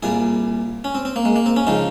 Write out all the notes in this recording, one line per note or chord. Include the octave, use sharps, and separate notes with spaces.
C2 A#2 G3 G#4
C#4
C4
C4
A#3
G#3
A#3
C4
C#4
C#3 F3 G#3 D#4